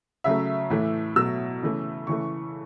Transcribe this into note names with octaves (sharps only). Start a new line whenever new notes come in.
C#3 F#3 A3 E5
A2 E3 A3
B2 F#3 A3 E6
C#3 E3 A3
C#3 E3 A3 C#6